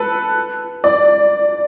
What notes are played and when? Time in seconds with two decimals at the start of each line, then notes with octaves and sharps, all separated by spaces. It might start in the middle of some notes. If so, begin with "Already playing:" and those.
Already playing: A4 B4
0.84 D5